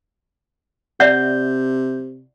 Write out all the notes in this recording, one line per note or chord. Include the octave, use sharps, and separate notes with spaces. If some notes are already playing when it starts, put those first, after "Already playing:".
C3 D5 E5 F#5 G6